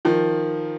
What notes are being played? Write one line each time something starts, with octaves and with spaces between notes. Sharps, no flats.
D#3 F3